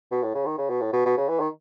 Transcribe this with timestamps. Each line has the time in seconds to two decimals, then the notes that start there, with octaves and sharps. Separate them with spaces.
0.11 B2
0.23 A2
0.35 C#3
0.46 D#3
0.58 C#3
0.70 B2
0.81 A2
0.93 B2
1.06 B2
1.17 C#3
1.29 E3
1.40 D#3